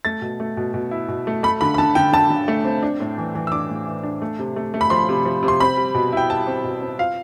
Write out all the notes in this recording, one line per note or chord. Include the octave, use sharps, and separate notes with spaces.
A3 A6
B2
A3
B2
B2
E4
B2
A3
A3 B5
D3 B5
B5
D3 A5
D3 G5
D3 A5
D3
A3
C4
D4
A2
E3
E3
E6
D4 D6
A2
E3
D4
A3
C3
A3
A3
B5
F3 C6
C3
F3
C3
C6
C4 B5
G3
B2
E4 G5
G3 A5
C4
B2
C4
F4 F5